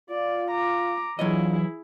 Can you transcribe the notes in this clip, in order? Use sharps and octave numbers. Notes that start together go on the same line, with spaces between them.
F4 D5
A#5 D6
E3 F#3 D4 E4 F4 G#4 C#5 D#5